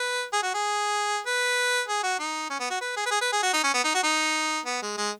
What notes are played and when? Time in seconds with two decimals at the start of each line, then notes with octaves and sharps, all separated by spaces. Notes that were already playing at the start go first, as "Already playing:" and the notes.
Already playing: B4
0.33 G#4
0.43 F#4
0.54 G#4
1.26 B4
1.88 G#4
2.03 F#4
2.19 D#4
2.50 C#4
2.60 B3
2.70 F#4
2.81 B4
2.97 G#4
3.06 B4
3.11 G#4
3.21 B4
3.33 G#4
3.43 F#4
3.53 D#4
3.64 C#4
3.74 B3
3.84 D#4
3.94 F#4
4.04 D#4
4.66 B3
4.82 G#3
4.97 G#3